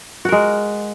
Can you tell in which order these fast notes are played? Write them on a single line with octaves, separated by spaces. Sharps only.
F#4 A#4 G#3